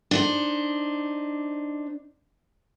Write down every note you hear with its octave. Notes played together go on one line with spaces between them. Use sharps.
D4 D#4 C5